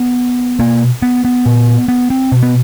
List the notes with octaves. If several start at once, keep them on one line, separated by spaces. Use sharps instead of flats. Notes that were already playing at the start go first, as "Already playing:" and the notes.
Already playing: B3
B2 A#3
B3
B3
A#2
B3
C4
B2
B3